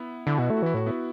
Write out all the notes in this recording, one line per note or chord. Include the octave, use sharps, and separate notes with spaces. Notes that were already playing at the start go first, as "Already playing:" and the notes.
Already playing: B3 E4
D3 E4
B2 F#4
A3 E4
F#4
E3 E4
A2 F#4
B3 E4